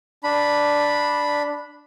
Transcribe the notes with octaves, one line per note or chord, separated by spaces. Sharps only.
D4 B5